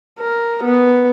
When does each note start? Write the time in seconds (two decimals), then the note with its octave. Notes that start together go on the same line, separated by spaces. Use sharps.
0.20 A#4
0.64 B3